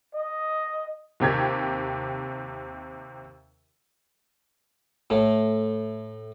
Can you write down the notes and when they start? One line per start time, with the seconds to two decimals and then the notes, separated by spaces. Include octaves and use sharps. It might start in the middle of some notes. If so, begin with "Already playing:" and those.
0.14 D#5
1.20 D#2 C3 G4 G#6
5.10 A2 A3